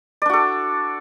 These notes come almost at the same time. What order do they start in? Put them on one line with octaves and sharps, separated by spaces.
D5 D4 F#4 A4